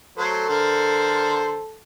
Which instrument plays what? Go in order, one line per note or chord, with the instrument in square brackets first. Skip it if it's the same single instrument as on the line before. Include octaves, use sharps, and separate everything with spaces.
[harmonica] F#3 A3 C5 [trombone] A4
[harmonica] D3 A#4 C5